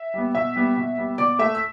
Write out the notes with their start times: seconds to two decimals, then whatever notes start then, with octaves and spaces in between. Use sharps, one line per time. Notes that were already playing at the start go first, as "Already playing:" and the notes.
Already playing: E5
0.14 G3 B3
0.35 B2 E5 E6
0.56 G3 B3
0.77 B2
0.98 G3 B3
1.18 B2 D5 D6
1.39 A3 E5 E6
1.55 E6